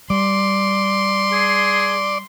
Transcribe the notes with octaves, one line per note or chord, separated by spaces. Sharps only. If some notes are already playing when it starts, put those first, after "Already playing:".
G3 D5 C6
G#4